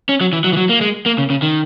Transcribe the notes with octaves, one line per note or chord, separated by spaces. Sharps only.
C#4
F#3
E3
F#3
E3
F#3
A#3
G#3
A#3
C#3
C#3
D#3